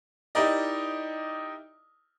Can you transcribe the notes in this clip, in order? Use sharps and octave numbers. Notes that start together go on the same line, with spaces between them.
D#4 E4 G4 A#4 D5 D#5